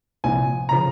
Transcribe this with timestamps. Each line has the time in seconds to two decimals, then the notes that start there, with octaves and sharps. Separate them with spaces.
0.24 C2 A#2 F3 G#5
0.69 C#3 F3 A#5